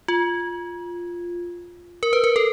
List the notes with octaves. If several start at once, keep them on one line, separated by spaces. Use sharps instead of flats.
F4
A#4
B4
A#4
A4